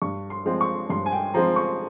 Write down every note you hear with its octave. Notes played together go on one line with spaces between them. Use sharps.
G2 C#6
C6
F3 G#3 C4
C#6
G2 C6
G#5
G5
F3 G#3 C4 A#5
C#6